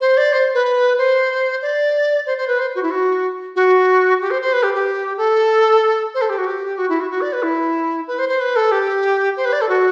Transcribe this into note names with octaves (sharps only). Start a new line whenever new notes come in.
C5
D5
C5
B4
C5
D5
C5
C5
B4
C5
F#4
E4
F#4
F#4
G4
C5
C5
B4
G4
G4
A4
C5
A4
G4
F#4
G4
F#4
E4
F#4
F#4
D5
B4
E4
B4
C5
C5
B4
A4
G4
C5
B4
D5
A4
F#4